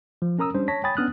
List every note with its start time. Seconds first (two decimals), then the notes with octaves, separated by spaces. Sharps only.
0.22 F3
0.39 C#4 A#4 A#5 D#6 E6
0.55 G3 C#4 D4 C5
0.68 C#5 A5 A#6 B6
0.84 C#5 G5 G#5 B5 D#6 A6
0.97 B3 C#4 D4 D#6 F6 F#6